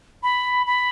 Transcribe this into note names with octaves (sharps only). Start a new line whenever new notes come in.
B5
B5